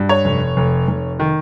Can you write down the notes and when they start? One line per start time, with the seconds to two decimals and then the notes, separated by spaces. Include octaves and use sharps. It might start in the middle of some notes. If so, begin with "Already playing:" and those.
Already playing: G2
0.09 C#5
0.25 F1
0.57 F1
0.88 F1
1.20 D#3